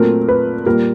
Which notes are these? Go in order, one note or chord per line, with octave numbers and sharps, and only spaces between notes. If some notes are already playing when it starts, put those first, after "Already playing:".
Already playing: A#2 F#3 A3 C4 A#4
B4
A#2 G3 A#3 A#4